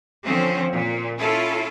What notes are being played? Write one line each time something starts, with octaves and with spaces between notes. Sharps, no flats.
D3 F3 C4 C#4
A#2
C#4 E4 F4 A4